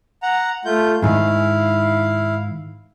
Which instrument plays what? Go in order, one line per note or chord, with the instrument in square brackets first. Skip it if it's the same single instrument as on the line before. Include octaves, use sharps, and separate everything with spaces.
[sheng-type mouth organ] F#5 A#5
A3 F4 G6
[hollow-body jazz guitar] G#2 D#3 [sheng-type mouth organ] E4 F5